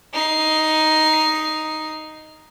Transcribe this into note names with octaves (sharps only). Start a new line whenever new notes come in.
D#4 C7